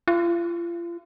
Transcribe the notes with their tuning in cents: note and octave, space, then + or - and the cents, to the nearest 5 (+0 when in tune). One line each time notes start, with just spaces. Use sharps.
F4 -35